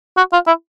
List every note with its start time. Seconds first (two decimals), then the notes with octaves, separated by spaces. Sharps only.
0.17 F#4
0.33 F4
0.47 E4